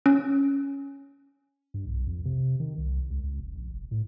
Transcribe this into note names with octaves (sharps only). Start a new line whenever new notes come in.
C#4
G2
B1
F2
C3
D#3
C2
C#2
C#2
F1
A#1
F1
A2